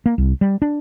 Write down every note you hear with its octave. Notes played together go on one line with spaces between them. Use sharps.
A#3
C2
G3
D4